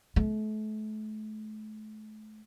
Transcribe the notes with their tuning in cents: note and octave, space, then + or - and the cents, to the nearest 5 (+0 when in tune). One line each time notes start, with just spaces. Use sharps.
A3 -35